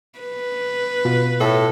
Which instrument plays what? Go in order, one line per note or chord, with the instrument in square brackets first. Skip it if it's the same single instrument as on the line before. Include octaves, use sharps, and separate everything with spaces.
[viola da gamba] B4
[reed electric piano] B2 F4 F#4
[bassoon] A2 [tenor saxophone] A4